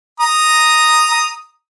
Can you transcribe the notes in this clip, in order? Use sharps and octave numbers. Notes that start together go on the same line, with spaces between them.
A#5 D#6